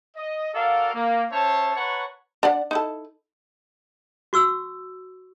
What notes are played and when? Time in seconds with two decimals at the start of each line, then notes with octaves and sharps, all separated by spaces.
0.17 D#5
0.53 F#4 A4 A#4 D5 F5
0.94 A#3
1.31 C#4 C5 C#5 E5 A5
1.75 B4 C#5 F#5 A5 A#5 C#6
2.43 D4 D5 F#5
2.71 D#4 E4 A4
4.33 F#4 C#6 E6